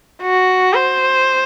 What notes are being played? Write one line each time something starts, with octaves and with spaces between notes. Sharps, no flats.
F#4
C5